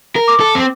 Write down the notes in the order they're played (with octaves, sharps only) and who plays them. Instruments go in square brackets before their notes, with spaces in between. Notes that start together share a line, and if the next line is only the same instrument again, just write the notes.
[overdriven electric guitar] A#4
[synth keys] D6
[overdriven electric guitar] A4
C4